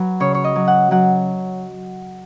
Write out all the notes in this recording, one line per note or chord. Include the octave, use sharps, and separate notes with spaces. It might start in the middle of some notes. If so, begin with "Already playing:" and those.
Already playing: F#3 B4
C#3 C#5
C#5
D#5
F#3
F#5
F#3 F#5